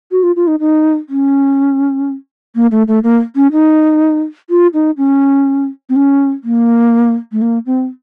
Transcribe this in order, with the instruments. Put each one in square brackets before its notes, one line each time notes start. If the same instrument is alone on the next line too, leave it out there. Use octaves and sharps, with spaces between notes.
[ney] F#4
F4
F4
D#4
D#4
C#4
A#3
A3
A3
A#3
C#4
D#4
F4
D#4
C#4
C4
C#4
A#3
A3
A#3
C4